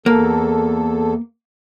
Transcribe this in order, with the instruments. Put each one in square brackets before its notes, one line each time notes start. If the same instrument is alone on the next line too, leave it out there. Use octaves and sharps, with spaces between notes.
[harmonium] E2 A4 [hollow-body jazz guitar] A#3